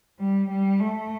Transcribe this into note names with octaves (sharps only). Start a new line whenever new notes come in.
G3
G3
A3